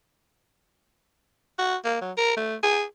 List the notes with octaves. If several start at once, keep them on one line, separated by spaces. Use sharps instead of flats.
F#4
A#3
F#3
A#4
A3
G#4